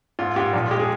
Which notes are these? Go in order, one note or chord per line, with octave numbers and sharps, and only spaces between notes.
G#2 F4
G#2 G4
A#1
F4
G#3 G4
G#4